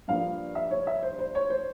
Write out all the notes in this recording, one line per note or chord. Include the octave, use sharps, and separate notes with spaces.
G2 F3 A#3 F5
E5
C#5
E5
C5
C5
C#5
C5